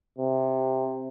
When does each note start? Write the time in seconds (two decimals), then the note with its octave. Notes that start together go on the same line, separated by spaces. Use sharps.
0.18 C3